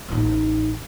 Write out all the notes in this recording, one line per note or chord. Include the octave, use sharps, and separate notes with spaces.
A1 D#4